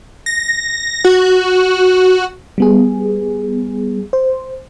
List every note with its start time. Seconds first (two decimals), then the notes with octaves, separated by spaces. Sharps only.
0.26 A#6
1.05 F#4
2.58 G3 B3 G#4
4.13 C5